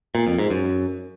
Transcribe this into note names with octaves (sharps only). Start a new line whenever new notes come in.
A#2
F2
G#2
F#2